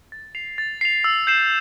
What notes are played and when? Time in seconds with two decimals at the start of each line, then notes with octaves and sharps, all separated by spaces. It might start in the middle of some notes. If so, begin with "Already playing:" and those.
0.12 A6
0.35 C7 F7
0.58 A6
0.81 C7 F7
1.04 E6
1.27 G6 C7 E7